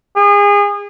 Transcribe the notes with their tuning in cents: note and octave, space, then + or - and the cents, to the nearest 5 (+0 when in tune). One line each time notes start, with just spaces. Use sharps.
G#4 -30